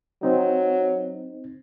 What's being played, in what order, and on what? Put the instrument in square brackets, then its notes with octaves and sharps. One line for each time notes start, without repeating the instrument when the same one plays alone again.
[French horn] F#3 [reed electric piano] C4 D#4